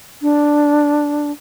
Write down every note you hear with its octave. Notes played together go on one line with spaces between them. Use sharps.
D4